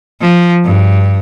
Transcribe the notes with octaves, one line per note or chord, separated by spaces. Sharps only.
F3
G2